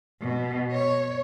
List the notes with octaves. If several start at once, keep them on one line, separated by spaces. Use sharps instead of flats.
B2
C#5